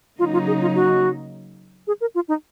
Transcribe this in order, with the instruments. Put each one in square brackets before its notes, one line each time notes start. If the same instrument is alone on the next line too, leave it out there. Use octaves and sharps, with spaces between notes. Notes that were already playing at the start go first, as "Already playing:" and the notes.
[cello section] C#3 F#3 A#3 D#4 [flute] F4
[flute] F4
G#4
F4
F#4
G#4
A#4
F4
D#4